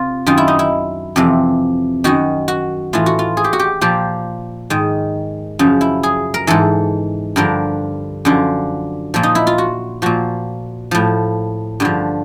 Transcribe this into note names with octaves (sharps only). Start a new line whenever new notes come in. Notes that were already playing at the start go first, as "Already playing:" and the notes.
Already playing: C3 F4
F#2 D#3 F4
E4
D#4
E4
F2 C3 E3
F#2 D#3 F#4
F#4
A2 E3 F4
F#4
F4
G#4
G4
F#4
G4
A#2 F3 G4
G#2 D#3
F#2 C#3 F3
E4
G#4
A#4
G#2 E3 A4
G2 D3 F3 A#4
F#2 D3 F3
A#2 F3
D#4
E4
F4
F#4
A#2 F3 F#4
A2 F3
G2 D3 F3